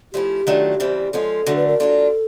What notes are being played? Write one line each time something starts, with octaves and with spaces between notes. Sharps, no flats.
F3 A3 C#4 E4 G4
D#3 F#3 A3 D4 F4
C#3 E3 G3 C4
F3 G#3 C#4 F4 A4
D3 F#3 A3 D4
B4
A#4
F#3 A#3 D4 F4 A4